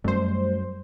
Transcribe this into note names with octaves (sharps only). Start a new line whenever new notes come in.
F#2 G3 A3 C5